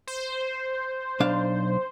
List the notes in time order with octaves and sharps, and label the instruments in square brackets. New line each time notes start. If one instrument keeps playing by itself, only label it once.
[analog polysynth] C5
[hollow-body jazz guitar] B1 D4 F5